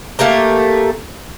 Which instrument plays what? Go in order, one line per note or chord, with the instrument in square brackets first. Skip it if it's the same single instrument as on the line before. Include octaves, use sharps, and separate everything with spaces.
[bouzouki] A3 A#3 G4 A#5